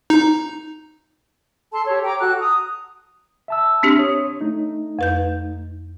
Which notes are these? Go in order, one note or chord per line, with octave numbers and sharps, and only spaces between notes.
D#4
A4 A5 C6
G4 A4 C#5
G5 A#5 D6
F#4 A4 F#6
A#5 D#6
E5 A5 E6
C4 D4 G4
C#5 D#6
A3 D#4
F2 B4 G6